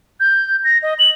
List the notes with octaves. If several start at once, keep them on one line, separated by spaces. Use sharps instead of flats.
G6
A#6
D#5
F#7